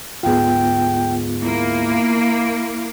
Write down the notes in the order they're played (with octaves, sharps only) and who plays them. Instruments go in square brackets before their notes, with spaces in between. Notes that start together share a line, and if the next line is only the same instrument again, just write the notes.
[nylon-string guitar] D2 G#2 G#4 [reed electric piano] B3 F4 [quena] G5
[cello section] A#3 [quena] E4